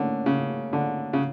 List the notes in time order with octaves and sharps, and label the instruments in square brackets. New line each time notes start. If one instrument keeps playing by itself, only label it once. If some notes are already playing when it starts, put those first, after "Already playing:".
Already playing: [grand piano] A2 A#3 C#4 [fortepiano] D3
[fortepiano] C#3
D3
C#3